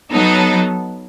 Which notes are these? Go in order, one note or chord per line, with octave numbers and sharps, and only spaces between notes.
F#3 B3 D#4 A4